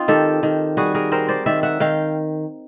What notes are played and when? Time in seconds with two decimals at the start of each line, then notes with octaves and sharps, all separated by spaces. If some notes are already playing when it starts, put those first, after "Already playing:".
Already playing: C4 D#4 F4
0.08 D#3 G4 A4
0.43 D#3
0.77 G3 F#4 G#4
0.95 G#4 A#4
1.12 C4 A#4 C5
1.28 C5 D5
1.46 D#3 D5 E5
1.63 E5 F#5
1.80 D#3 F5 G5